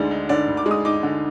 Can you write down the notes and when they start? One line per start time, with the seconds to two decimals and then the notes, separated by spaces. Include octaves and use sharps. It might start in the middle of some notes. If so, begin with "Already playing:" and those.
Already playing: D2 D3 G#3 D#4 D5
0.11 D#4
0.29 D3 D5
0.48 D2
0.57 D6
0.66 G#3
0.71 D#6
0.85 D#4 D6
1.03 D3